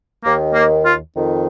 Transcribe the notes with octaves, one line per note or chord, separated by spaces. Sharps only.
D#2 D#3 A#3
A#3
F4
F2 D#3